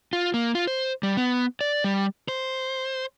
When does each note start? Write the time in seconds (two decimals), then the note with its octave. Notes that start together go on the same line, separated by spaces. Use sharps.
0.13 F4
0.34 A#3
0.55 F4
0.67 C5
1.03 G3
1.17 B3
1.61 D5
1.84 G3
2.28 C5